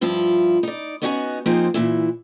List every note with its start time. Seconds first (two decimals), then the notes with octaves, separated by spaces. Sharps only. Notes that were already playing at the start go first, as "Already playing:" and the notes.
0.01 G2 F3 E4 F4
0.63 D#4 D5
1.02 B3 C#4 D#4 F#4 C#5 G#5
1.46 F3 A#3 C4 D#4 G#4 C5
1.74 A#2 E3 E4